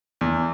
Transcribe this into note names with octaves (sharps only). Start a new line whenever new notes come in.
E2